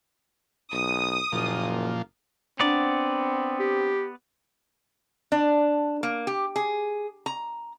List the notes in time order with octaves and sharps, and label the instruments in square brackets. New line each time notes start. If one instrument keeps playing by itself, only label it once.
[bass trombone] B1 [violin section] D#6
[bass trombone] F#1 [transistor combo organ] A#2 F3
[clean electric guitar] B3 D5 [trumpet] C4 [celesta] D4 F#5 A#5
[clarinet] G4
[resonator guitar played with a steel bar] D4
A#3
G4
G#4
A#5